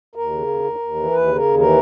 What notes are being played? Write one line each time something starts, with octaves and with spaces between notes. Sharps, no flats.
D#2 A#4
C#3
D#2
D#2
D#2
E3
D#2 B4
C#3
A#4
D#2
E3 A#4